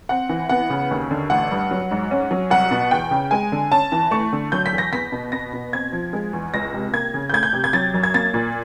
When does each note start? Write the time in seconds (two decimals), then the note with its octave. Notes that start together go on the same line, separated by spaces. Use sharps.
0.09 C4 F#5
0.29 E3
0.49 B3 F#5
0.70 C#3
0.91 D#2
1.11 D3
1.30 A1 F#5
1.51 G2
1.71 F#3
1.91 G#2
2.11 C#4
2.31 F#3
2.50 C2 F#5
2.71 B2
2.91 E2 G5
3.11 C#3
3.31 G#3 G#5
3.52 D3
3.71 C#4 A5
3.92 E3
4.11 A3 C#6
4.33 D3
4.52 F#3 G6
4.66 B6
4.73 E2
4.78 A#6
4.92 B3 B6
5.12 B2
5.32 B3 A#6
5.53 B2
5.73 C4 G#6
5.93 F3
6.13 G#3
6.33 E2
6.54 C#2 A#6
6.73 C3
6.93 A#3 G#6
7.14 C#3
7.30 G6
7.33 A3 G#6
7.43 G6
7.53 C3
7.64 G#6
7.73 F#3 A6
7.94 F#2
8.03 G#6
8.14 A#3 A6
8.34 A#2